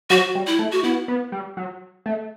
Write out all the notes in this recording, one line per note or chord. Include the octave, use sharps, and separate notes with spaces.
F#3 F#4
G3
E4
A3
F#4
B3 E4
B3
G3
F#3
A3